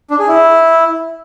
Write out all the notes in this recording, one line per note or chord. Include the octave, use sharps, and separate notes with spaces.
D4
G#4
E4